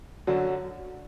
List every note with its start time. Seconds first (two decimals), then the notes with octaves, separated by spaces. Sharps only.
0.27 F#2 D3 F#3